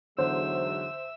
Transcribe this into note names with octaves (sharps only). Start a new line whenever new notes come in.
E2 G#2 D3 F#3 C5 E5 E6